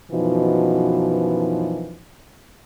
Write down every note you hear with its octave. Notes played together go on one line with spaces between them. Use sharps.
F#2 B2 E3 F3 D#4 F#4